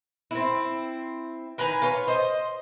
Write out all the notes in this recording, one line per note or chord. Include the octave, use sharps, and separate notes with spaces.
C4 E4
D#3 B4 G#5 A#5
F4 B4 C#5
C5 D#5